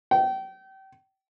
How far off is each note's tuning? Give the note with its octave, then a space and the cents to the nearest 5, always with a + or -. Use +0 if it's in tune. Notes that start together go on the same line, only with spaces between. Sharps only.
G5 -30